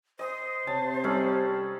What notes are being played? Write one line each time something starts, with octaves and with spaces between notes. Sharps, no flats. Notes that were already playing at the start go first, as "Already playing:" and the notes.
C5 D#5 D#6
C3 C#5 A5
G3 C#4 D#4 A4